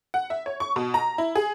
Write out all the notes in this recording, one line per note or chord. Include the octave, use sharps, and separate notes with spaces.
F#5
E5
C#5
C#6
B2
A#5
E4
G#4